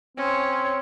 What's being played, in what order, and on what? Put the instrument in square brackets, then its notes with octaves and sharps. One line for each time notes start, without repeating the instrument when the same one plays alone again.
[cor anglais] C4 [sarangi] C#4